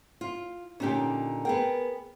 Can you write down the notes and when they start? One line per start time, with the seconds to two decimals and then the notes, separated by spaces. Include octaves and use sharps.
0.21 F4
0.80 A#2 D3 C#4 D#4 G4
1.45 B3 G#4 A#4 G5